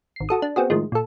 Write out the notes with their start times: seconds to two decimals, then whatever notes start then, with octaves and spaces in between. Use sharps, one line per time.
0.16 G#1 C7
0.29 F#4 A4 D#6
0.42 D4
0.56 B3 C4 F#4 G#4
0.70 A2 D#3 F3 G#3
0.92 A#2 A4